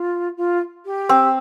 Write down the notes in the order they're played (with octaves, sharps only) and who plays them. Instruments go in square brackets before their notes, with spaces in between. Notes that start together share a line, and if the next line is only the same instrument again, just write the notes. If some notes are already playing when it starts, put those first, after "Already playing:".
Already playing: [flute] F4
F4
G4
[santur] C4